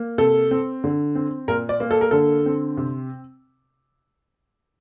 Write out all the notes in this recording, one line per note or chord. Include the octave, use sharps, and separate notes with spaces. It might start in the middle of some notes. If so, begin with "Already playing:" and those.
Already playing: A#3
C3 A4
C4
D3
C4
A#2 A#4
D5
A#3
A4
A#4
D3 A4
C4
C3